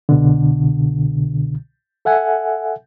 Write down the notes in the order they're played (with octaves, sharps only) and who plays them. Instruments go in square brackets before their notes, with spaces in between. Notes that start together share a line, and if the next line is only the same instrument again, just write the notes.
[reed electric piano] C2 B2 D3
A4 E5 F#5 G#5